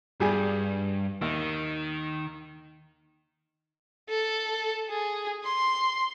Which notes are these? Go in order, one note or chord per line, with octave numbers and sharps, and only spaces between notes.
G2 G3 G#4 G#5
D#2 D#3
A4
G#4
C6